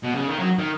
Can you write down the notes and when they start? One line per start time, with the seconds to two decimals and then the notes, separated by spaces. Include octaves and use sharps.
0.03 B2
0.15 C#3
0.27 D#3
0.39 F#3
0.59 D#3